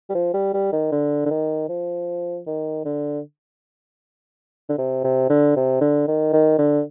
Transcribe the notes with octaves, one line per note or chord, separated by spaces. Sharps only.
G3
F3
G3
G3
D#3
D3
D3
D#3
F3
D#3
D3
D3
C3
C3
D3
C3
D3
D#3
D#3
D3